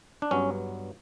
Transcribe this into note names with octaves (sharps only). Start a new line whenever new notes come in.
D4
G2 F#3 B3 C#4